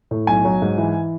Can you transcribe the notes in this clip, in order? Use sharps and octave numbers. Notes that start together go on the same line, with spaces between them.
A2
B1 G#5
F#3
G#2
E3